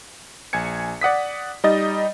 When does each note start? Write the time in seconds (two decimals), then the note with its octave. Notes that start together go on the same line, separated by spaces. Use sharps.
0.53 A#1 G#5 G#6 C#7
1.01 D5 F#5 D#6 B6
1.64 G3 D#4 D#5 A6